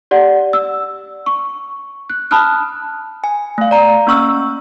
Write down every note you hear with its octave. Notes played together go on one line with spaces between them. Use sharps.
G4 D5 F#5
E6
C#6
F#6
A5 B5 D#6 F6 F#6
G#5
A3 F5
D5 A#5
A#3 C#4 C#6 E6 F6